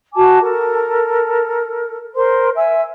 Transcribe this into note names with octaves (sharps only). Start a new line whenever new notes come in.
F#4 G#5 A5 D6
A4 A#4
A#4 C5 C6
E5 G#5 E6